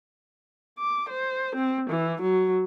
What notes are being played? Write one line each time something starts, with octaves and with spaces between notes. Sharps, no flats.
D6
C5
C4
E3
F#3